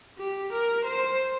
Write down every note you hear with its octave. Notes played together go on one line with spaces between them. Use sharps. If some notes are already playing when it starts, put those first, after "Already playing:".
G4
A#4
C5